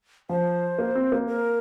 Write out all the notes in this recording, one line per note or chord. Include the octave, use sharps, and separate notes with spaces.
F3 C5
A#3
C4
A#3
A#4